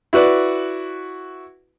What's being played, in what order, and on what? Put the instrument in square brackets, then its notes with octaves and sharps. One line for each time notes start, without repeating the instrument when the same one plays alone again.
[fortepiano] E4 F#4 B4 D5